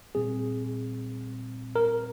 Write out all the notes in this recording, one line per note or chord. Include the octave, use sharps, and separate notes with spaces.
A#2 G3 C4 G#4
A#4